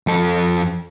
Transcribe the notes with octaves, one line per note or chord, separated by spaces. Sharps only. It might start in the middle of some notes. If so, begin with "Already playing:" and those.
F2 A4